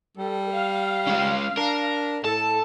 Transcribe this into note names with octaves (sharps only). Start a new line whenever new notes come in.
G3 A4
F5
G#3 C#4
D4 A#4
A2 A4 A5